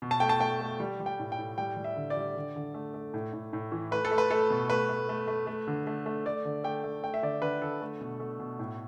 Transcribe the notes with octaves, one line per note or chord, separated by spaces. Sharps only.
B2
A5
A3 G5
A5
A3 G5
A3
G3
G3
G5
A2
G5
A2
G3 G5
G3
E5
D3
D5
G3
D3
D3
A3
A3
A2
A2
A2
E3
A3 B4
A4
A3
B4
A3 A4
B2
A3 B4
A3
A3
A3
A3
D3
A3
A3
A3 D5
D3
A3 G5
A3
A3 G5
E5
D3 D5
D3 B4
D3 A4
A3
B2
A3
B2
A2